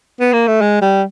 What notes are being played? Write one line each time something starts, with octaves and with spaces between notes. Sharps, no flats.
B3
A#3
A3
G#3
G3